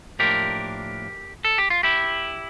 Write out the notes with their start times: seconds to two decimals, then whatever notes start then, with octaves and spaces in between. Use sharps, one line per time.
0.19 A2 F3 A#3 D4 G4 A#4
1.45 A4
1.58 G4
1.70 F4
1.83 E4 G4